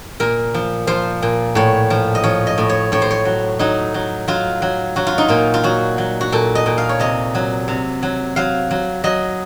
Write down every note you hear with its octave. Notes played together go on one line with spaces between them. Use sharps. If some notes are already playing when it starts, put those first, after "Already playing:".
A#2 A#4
F3
F3 C5
A#2
A2 C#5
F3
D#5
F3 C#5
D#5
A2
C#5
A2 C#5
C5
C#5
F#3
F#3 D#4
F#3
F#3 F4
F#3
F#3 F#4
F4
D#4
A#2 F4
F4
F#3 F#4
F#3
F#4
A#2 A4
D#5
A#2
F5
C#5
C3 D#5
F#3
C3
F#3
F#3 F5
F#3
F#3 D#5